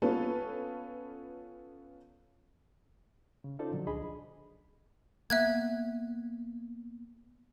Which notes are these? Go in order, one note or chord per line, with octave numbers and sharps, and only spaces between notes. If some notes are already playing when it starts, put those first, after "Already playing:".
B3 C#4 F4 A4 B4
C#3
C#4 D#4 F4 A4 C5 D5
A#2 D3 F3 F#3
C#2 D4 G#4 D#5 B5
A#3 B3 E5 F#6 G#6